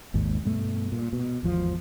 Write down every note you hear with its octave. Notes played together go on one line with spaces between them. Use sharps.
G#1 D#2 G#2
G2 B2 A3
A#2
B2
G#1 E2 F3